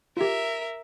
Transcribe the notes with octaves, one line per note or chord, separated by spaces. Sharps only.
F4 G4 A#4 E5